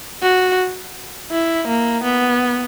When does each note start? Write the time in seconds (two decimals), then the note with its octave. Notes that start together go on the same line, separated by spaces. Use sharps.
0.22 F#4
1.31 E4
1.67 A#3
2.03 B3